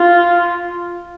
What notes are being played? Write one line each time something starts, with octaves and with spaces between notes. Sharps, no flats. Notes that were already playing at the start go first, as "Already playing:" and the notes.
Already playing: F4